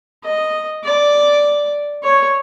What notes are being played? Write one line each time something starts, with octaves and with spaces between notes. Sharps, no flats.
D#5
D5
C#5